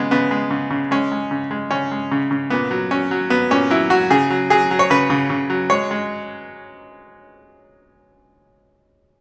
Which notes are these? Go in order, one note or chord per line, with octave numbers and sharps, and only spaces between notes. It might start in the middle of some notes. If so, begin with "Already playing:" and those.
Already playing: C#3 G#3 B3
C#3 B3
G#3
C#3
C#3
G#3 C#4
G#3
C#3
G#3
C#3 C#4
G#3
C#3
C#3
A#2 B3
F#3
F#3 C#4
F#3
F#3 B3
A#2 C#4
F#3 E4
F#3 F#4
C#3 G#4
F#3
F#3 G#4
F#3
C#5
C#3 B4
C#3
C#3
F#3
G#3 C#5
G#3